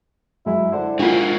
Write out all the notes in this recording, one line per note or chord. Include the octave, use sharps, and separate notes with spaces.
F#2 F#3 G#3 E4
D3 E4 C5 F#5
G#3 A#3 D4 F4 F#4